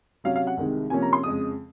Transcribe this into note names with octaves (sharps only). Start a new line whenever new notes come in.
C3 F#3 C#4 F5
F5
F#5
C2 C3 D#3 G#3
C3 F3 A#3 C#4 G#5
A#5
C6
F2 C#3 G#3 D#6